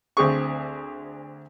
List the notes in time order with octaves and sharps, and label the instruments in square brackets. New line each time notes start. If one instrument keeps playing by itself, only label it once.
[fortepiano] D2 C4 G#4 C#6